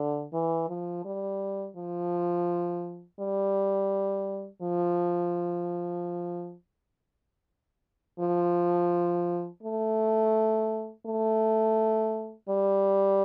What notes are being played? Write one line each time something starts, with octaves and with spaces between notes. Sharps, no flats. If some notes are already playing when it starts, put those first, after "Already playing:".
Already playing: D3
E3
F3
G3
F3
G3
F3
F3
A3
A3
G3